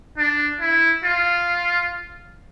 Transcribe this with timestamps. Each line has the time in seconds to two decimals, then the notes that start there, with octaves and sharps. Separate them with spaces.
0.18 D4
0.60 E4
1.04 F4